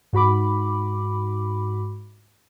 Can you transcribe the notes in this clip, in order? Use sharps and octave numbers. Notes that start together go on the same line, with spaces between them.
G#2 F#4 B5 D6